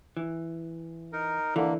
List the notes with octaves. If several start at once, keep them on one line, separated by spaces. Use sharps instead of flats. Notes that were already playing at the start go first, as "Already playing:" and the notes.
E3
D#4 A#4
D3 E3 A#3